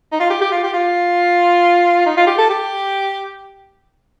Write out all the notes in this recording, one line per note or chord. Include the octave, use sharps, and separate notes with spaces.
D#4
F4
G4
G4
F4
G4
F4
D#4
F4
G4
A4
G4